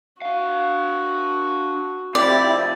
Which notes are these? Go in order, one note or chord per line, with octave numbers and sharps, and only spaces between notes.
D4 F#4 F5
C3 F3 C4 E4 G4 D5